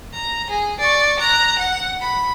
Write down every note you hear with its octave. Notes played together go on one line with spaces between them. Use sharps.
A#5
G#4
D5 C#6
A#5 F#6
F#5
B5